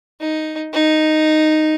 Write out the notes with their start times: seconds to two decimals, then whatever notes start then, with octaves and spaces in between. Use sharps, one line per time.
0.20 D#4
0.73 D#4